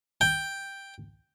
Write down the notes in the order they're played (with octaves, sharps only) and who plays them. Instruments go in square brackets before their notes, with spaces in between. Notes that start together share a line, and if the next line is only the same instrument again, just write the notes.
[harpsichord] G5